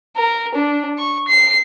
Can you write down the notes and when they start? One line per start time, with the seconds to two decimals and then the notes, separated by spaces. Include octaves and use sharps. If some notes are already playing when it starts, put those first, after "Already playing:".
0.17 A#4
0.55 D4
0.98 C#6
1.28 C7